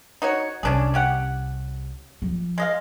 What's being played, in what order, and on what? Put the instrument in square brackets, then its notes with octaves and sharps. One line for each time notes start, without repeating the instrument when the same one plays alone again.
[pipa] D#4 F#4 C#5
[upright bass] C2 [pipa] C#4 D4 G#4
[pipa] C#4 G4 F#5
[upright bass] F3
[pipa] G#3 D#5 F5